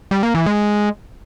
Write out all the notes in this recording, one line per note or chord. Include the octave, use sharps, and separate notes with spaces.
G3
A#3
E3
G#3